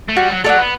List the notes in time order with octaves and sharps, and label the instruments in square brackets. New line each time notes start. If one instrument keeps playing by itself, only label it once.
[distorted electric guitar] A3
[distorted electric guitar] G3 [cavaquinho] F#4
[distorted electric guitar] F#3
[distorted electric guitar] F#3 [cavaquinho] A4 D5 F#5
[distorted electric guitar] B3